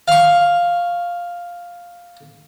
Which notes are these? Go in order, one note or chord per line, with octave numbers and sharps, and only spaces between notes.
F5 C#6